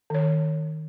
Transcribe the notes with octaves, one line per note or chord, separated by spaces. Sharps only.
D#3 C#5